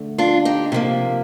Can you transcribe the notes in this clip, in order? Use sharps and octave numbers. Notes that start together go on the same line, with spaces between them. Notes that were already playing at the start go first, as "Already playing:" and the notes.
Already playing: D2 D3 A3
D4 F4
D#4 G4
C3 F3 A#3